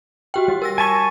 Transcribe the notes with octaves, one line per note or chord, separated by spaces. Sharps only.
F#4 G4 G5
G3
A#4 E6 A#6
G#5 A5 C#6 A6 B6 D#7